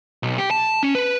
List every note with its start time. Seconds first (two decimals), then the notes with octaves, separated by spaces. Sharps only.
0.23 B1
0.38 G4
0.51 A5
0.83 C#4
0.95 B4